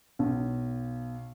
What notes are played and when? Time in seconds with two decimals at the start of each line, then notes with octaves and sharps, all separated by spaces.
0.19 B1